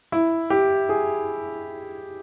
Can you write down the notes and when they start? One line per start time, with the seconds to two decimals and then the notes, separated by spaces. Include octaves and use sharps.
0.12 E4
0.50 G4
0.89 G#4